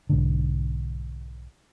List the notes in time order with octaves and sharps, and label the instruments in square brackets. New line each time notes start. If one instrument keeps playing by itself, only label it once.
[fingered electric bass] B1 G#2 D3